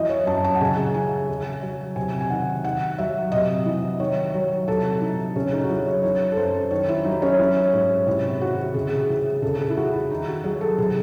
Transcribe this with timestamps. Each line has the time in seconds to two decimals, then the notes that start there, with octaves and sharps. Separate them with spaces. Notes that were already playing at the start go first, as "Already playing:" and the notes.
Already playing: E3 F#3 D#5
0.09 C#5
0.26 F#2 A5
0.44 A5
0.55 F#5
0.61 C#3 G#5
0.94 E3 G#5
1.29 C#3
1.63 F#3
1.96 C3 G#5
2.21 G#5
2.30 D#3 F#5
2.65 D#3 F#5
2.98 F#3 E5
3.32 C3 D#5
3.66 E3
4.00 D#3 C#5
4.34 F#3 C#5
4.68 C3 A4
5.01 E3 D#4
5.36 C#3 C#4
5.52 D#4
5.64 F#4
5.69 F#3 E4
5.86 C#5
6.03 E3 C#5
6.32 A4
6.37 F#2 C5
6.71 D#3 C#5
6.89 E4
7.05 F#3 D#4
7.22 C#4
7.39 E3
7.73 G#2
8.06 C3 E4
8.41 D#3 F#4
8.74 C#3 G#4
9.09 E3
9.42 C#3 A4
9.59 G#4
9.69 E4
9.77 E3 F#4
9.93 E4
10.10 D#3 D#4
10.28 F#4
10.44 F#3 G#4
10.61 A4
10.78 C3 G#4